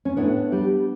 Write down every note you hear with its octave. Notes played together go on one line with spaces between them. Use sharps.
C#4
A2 B3 D4
G3